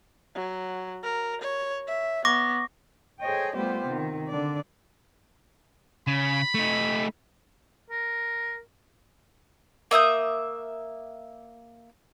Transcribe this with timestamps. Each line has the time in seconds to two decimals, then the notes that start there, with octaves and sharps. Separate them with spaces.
0.35 F#3
1.03 A#4
1.42 C#5
1.88 E5
2.25 B3 C#6 D6 A#6
3.21 G#4 A4 C5 C#5 D#5 G5
3.54 G3 A3 B3 F4 G4 C5
3.86 C3 D#3
4.28 D3 D4 D5
6.07 C#3 B5
6.55 A3 D#4
7.90 A#4
9.91 A#3 E5 D#6 G6